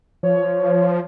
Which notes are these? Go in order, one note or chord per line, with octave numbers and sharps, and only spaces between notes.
F3 C#5